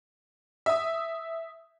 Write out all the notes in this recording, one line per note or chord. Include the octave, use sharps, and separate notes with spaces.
E5 D#6